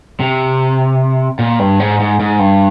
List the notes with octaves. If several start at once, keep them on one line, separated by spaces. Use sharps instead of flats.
C3
A#2
G2
G#2
G#2
G#2
G2